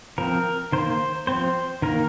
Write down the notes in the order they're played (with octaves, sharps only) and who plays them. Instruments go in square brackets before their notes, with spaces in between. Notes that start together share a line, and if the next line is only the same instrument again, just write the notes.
[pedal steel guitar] F3 C4 A#4
D#3 A#3 C5
F3 C4 C5
D#3 A#3 A#4